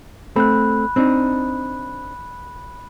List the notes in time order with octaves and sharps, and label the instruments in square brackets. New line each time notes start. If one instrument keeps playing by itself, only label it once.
[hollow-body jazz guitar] A3 C4 [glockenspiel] B5 F#6
[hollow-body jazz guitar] C4 D4 D#4